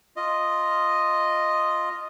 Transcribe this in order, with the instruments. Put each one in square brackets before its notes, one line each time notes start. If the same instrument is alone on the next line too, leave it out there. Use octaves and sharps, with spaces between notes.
[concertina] F4 D#5